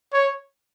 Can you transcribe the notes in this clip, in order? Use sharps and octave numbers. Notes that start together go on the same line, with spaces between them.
C#5